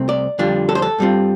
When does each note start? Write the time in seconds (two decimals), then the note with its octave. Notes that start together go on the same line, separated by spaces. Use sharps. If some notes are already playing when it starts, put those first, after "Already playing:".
Already playing: C2 C3 A3 C4
0.09 D5
0.39 F2 D3 G3 D4 F4
0.69 A4
0.75 C5
0.82 A4
0.99 G2 G3 C4 F4